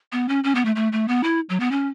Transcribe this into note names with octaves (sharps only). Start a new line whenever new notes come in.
B3
C#4
C#4
B3
A3
A3
A3
B3
E4
F#3
B3
C#4